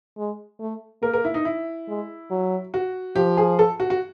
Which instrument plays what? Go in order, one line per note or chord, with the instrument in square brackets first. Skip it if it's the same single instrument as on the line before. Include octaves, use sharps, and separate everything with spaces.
[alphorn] G#3
A3
[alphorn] A#3 [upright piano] A#4
[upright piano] A#4
E4
D#4
E4
[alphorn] G#3
F#3
[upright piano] F#4
[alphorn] F3 [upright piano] G4
[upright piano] G#4
A4
F#4
F#4